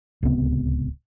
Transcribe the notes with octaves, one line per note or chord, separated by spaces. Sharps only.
D1 C#2 C3 B3